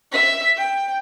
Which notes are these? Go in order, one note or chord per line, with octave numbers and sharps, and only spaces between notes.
E5 B6
G5